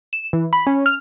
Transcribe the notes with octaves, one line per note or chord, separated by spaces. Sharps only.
E7
E3
B5
C#4
F6